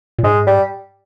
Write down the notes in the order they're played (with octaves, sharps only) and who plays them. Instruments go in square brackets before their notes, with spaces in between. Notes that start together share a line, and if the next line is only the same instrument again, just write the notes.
[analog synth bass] A#2
[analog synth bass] G#2 [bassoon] G#3
[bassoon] G3